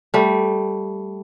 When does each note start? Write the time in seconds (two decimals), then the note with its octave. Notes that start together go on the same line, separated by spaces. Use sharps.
0.14 G3 A3